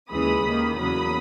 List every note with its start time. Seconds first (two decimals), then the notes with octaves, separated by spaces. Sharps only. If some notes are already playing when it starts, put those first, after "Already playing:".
0.11 D#2 C#3 E3 G#3 B5 D#6
0.44 D#2 D#3 A#3
0.76 E2 C#3 F#3 A#3 B5 D#6